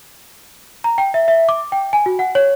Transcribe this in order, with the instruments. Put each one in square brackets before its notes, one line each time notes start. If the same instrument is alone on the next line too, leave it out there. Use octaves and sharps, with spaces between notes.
[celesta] A#5
G5
E5
E5
D6
G5
G#5
F#4
F#5
C#5